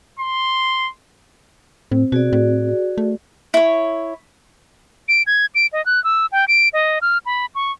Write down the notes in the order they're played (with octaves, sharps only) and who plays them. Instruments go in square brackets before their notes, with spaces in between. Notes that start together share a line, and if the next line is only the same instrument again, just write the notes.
[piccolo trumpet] C6
[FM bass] A2 [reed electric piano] C4
[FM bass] B2 [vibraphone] F#4 G#4 D5
[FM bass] A2
A3
[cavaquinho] E4 C#5
[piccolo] D7
G#6
D7
D#5
F#6
E6
G5
D7
D#5
F6
B5
C#6